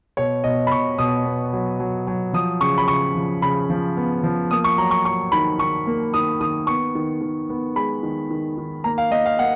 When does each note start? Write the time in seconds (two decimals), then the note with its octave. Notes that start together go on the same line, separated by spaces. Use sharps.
0.17 B2 C#5
0.44 B2 D#5
0.67 B5
0.71 B2 C#6
0.98 B2 D#6
1.25 B3
1.53 F#3
1.80 F#3
2.07 F#3
2.33 F3 D#6
2.60 C#3 C#6
2.78 B5
2.88 C#3 C#6
3.16 F3
3.42 C#3 B5
3.70 F3
3.97 B3
4.24 F3
4.51 A#3 D#6
4.64 C#6
4.78 F#3 A#5
4.91 C#6
5.05 F#3 C#6
5.32 D#3 B5
5.59 D#3 C#6
5.87 A#3
6.14 D#3 D#6
6.40 D#3 D#6
6.67 B3 C#6
6.95 D#3
7.21 D#3
7.50 B3
7.76 G#3 B5
8.03 D#3
8.31 D#3
8.58 D#3
8.84 A#3 A#5
8.98 F5
9.11 A#3 D#5
9.26 F5
9.39 A#3 F#5